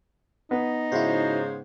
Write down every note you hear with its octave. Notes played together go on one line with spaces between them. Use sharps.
B3 D#4
G#2 C#3 E4 F#4 C5